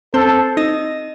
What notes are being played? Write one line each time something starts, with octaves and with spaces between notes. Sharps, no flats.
C4 A4 C5
D#4 D#5